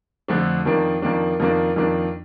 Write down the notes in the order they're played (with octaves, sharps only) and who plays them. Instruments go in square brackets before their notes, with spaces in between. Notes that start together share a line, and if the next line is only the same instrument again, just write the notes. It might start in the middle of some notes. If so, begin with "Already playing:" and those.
[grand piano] F2 D3 F3 A3 D4
F2 D#3 A#3 D4
F2 D#3 A#3 D4
F2 D#3 A#3 D4
F2 D#3 A#3 D4